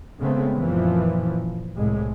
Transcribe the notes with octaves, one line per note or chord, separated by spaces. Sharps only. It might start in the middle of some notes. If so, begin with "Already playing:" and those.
C#3 G#3 A3 B3 C4
F#2 A#2 E3 F3
C2 A2 G#3